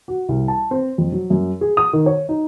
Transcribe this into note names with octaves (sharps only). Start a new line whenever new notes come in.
F#4
C2
A5
C4
F2
F#3
F#2
G#4
D#6
D#3
C#5
D#4